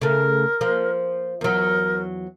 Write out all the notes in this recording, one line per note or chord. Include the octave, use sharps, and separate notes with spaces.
C#3 A3 A#4
F3 A#3
E2 F#3 A#4